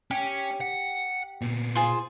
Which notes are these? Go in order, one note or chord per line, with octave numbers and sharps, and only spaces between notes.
C#4 G4
F#5
A#2 B3
F4 G#4 C5